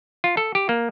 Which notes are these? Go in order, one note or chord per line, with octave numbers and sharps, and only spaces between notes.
F4
A4
G4
A#3